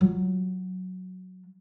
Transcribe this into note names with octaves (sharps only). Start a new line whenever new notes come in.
F#3 F4